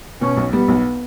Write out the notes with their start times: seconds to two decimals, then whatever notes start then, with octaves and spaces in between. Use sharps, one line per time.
0.21 B2 C#4
0.37 B1
0.53 G3 B3
0.68 B1